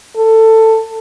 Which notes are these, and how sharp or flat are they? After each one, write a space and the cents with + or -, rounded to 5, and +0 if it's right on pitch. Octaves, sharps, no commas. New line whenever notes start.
A4 +15